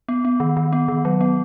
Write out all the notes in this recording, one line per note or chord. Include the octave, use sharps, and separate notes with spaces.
B3
B3
D#3
D#3
B3
D#3
F#3
B3